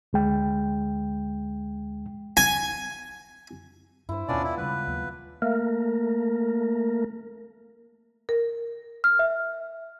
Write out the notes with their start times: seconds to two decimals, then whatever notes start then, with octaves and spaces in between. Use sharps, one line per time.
0.13 D2 G#3 G5
2.37 G#5
4.09 G2 D4 E4 C5
4.28 D#2 B2 B3 C#4 D4 F4 D5
4.44 E4
4.58 C#3 G3 G#3 B4
4.87 D#2 F#3 A#3
5.42 A3 A#3 A#4
8.29 A#4
9.04 F6
9.19 E5